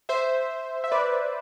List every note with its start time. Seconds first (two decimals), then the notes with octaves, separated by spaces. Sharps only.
0.09 C5 E5
0.84 E5
0.92 B4 D5